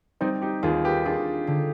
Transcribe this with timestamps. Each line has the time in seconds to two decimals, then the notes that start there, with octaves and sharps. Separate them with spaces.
0.21 G3 C4 D#4
0.42 D#4 G4
0.63 D#2 F4 G#4
0.84 G4 B4
1.05 D4 F4 G#4
1.47 D3